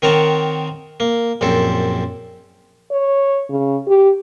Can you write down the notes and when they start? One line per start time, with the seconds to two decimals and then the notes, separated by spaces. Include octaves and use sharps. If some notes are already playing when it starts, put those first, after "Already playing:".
0.02 D#3 C4 A#4 C#5 F#5 A5
1.00 A#3
1.41 A#1 F#2 C4 A4
2.92 C#5
3.50 C#3
3.88 G4